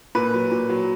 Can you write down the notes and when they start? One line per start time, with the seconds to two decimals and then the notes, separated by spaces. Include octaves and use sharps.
0.15 A#2 B4
0.34 F#3
0.51 A#2
0.69 F#3